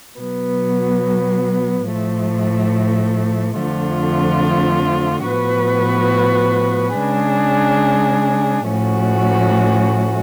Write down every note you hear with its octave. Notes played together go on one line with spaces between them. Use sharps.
B2 F#3 B3
A2 F3 A3
F2 D3 F3 A3 F4
A2 F3 B3 F#4 B4
C#3 G#3 D4 G#4
A2 F3 A3 C#4 F#4